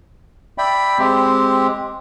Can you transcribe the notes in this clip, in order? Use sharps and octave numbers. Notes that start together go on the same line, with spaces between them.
D5 E5 G5 B5
G#3 C4 G4